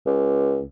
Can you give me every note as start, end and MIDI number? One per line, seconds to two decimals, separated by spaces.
0.06 0.64 37